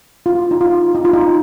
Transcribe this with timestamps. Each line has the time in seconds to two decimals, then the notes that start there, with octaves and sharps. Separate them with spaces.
0.26 F4
0.51 D#4
0.61 F4
0.95 D#4
1.05 F4
1.13 D#4